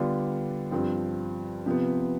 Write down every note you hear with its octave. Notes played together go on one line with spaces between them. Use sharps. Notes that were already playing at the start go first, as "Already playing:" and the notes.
Already playing: D3 G3 B3 D4 F4
G2 F3 C4
C3 F3 B3